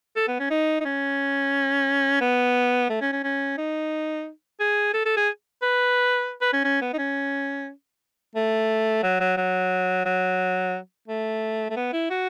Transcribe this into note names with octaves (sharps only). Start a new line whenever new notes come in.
A4
B3
C#4
D#4
D#4
C#4
B3
A3
C#4
C#4
C#4
D#4
G#4
A4
A4
G#4
B4
B4
C#4
C#4
B3
D#4
C#4
A3
F#3
F#3
F#3
F#3
A3
A3
B3
E4
F#4